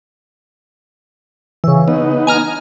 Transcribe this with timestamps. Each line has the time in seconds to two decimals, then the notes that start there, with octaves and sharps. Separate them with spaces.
1.64 C#3 E3
1.88 B3 D#4
2.27 G#5 A#5 F6